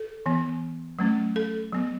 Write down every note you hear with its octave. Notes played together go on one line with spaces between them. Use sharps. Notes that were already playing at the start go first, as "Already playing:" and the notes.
Already playing: A4
E3 B3
F#3 A3 C#4
A4
F#3 B3